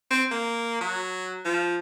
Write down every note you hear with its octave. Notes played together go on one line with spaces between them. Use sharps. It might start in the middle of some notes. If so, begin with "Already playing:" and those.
C4
A#3
F#3
F3